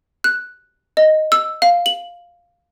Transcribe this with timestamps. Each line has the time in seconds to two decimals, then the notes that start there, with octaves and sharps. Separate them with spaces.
0.24 F#6
0.97 D#5
1.32 E6
1.62 F5
1.86 F#7